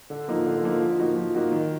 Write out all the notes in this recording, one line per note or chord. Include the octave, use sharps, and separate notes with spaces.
D3
F3 A#3 D#4
D3
F3 A#3 D#4
F3
A#3 D#4 F#4
F3
A#3 D#4 F#4
D#3